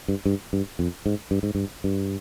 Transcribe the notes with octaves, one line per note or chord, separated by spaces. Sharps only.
G2
G2
G2
F2
G#2
G2
G#2
G2
G2